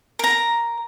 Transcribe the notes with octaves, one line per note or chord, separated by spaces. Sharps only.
A#4 A#5